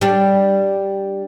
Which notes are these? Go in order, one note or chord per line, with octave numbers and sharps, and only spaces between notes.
G3 D4